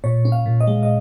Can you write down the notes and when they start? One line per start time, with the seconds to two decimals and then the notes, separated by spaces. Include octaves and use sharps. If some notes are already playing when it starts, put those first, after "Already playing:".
0.04 A#2 C#5
0.25 C#4
0.32 F5
0.46 A#2
0.61 D#5
0.67 G#3
0.83 D#5